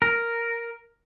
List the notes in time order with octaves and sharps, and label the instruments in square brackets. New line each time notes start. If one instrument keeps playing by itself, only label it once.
[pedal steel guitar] A#4